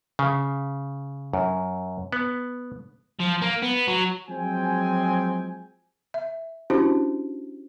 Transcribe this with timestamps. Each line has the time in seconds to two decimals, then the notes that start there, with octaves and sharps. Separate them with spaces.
0.19 C#3
1.33 F#2
2.13 B3
3.20 F3
3.41 A#3
3.62 B3
3.87 F#3
4.29 F3 F#3 G#3 C4 G5 G#5
6.14 E5
6.70 C#4 D4 E4 F#4 G4 C5